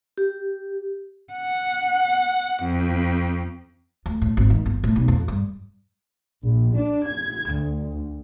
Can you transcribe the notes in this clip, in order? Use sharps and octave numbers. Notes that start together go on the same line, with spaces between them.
G4
F#5
F2
D2
A2
G#1
D#3
G1
A2
B1
F2
G2
A#1
D4
G#6
D2